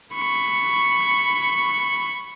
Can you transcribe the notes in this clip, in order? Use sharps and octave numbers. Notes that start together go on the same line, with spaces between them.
B5 C#6